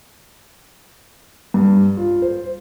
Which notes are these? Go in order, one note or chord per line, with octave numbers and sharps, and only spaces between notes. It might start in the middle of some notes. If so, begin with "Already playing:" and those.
G2
F4
C5